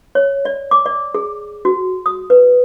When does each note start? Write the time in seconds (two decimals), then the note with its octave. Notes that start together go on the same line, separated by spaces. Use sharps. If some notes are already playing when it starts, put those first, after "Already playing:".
0.15 C#5
0.45 D5
0.71 D6
0.86 D5
1.14 G#4
1.65 F#4
2.06 D#6
2.30 B4